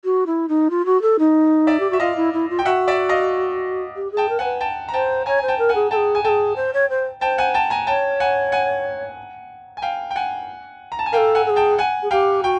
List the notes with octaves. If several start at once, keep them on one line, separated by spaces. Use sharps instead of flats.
F#4
E4
D#4
F4
F#4
A4
D#4
D5 E5
G4
F#4 E5
F4 D#5 F5
E4
E4
F4
G5
F#4 E5 F#5
D5 E5
D#5 F5
G4
G#4
G5 A5
A#4
C5 F#5 G#5
B4
G5 A5
A#5
C5 G5 A5
C#5 G#5 A#5
C5 G#5
G5 A5
A#4
F#5 G#5
G#4
A4 G5 A5
G#4
G#5
G#4 A4 G5 A5
C5
C#5
C5
C5 G5 A5
F#5 G#5
G5 A5
G#5 A#5
C#5 G5 A5
F#5 G#5
F#5 G#5
G#5
F5 G5
G5
F#5 G#5
A#5
A5
G#5
A4 A#4 F5 G5
F#5 G#5
A4
G#4
G5 A5
F#5 G#5
G#4
G4 F5 G5
F#4 G5